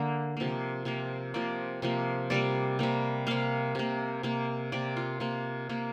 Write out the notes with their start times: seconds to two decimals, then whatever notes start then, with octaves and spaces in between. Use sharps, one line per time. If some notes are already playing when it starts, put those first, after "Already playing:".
Already playing: D3 A#3
0.37 C3 F3 A#3
0.85 C3 F3 A#3
1.34 C3 F3 A#3 D5
1.82 C3 F3 A#3
2.30 C3 G3 A#3 D5
2.79 C3 G3 A#3
3.27 C3 A#3 F5
3.75 C3 A#3
4.23 C3 A#3
4.72 C3 A#3 D5
4.97 F4
5.20 C3 A#3
5.69 C3 A#3